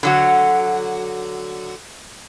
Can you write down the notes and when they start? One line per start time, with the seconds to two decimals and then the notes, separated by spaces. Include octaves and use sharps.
0.03 D3 F#3 F#4